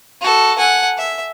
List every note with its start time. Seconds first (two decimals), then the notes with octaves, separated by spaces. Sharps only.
0.21 F#4 A4
0.59 F#5 G#5
0.98 E5